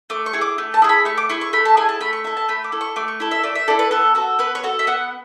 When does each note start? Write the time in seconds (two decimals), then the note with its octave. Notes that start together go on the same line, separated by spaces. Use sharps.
0.10 A3 D6
0.26 C#6
0.33 E4 G#4
0.41 D6
0.58 A3
0.74 A5
0.82 E4 G#4
0.89 B5
1.05 A3 C#6
1.17 D6
1.30 E4 G#4 C#6
1.41 C#6
1.53 A3 B5
1.65 A5
1.77 E4 G#4 G#5
1.89 A5
2.01 A3 B5
2.13 C#6
2.24 E4 A4 A5
2.37 A5
2.48 A3 B5
2.64 D6
2.72 E4 A4
2.81 C#6
2.96 A3 D6
3.08 C#6
3.20 E4 A4
3.31 E5
3.44 A3 D5
3.55 E5
3.68 E4 A4 D5
3.79 B4
3.91 B3 A4
4.15 F#4 A4
4.39 B3 B4
4.55 C#5
4.64 F#4 A4
4.79 E5
4.87 B3 F#5